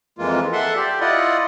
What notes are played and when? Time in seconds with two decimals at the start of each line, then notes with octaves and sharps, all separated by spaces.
0.18 F2 E3 G#3 A#3 F4
0.52 A4 E5 F#5 C6
0.76 G4 D5
1.01 E4 F4 D5 D#5 F#5